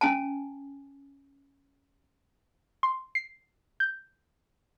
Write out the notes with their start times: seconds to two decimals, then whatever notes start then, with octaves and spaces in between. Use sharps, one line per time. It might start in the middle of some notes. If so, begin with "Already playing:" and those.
0.01 C#4 G#5 A5
2.83 C6
3.15 C7
3.80 G6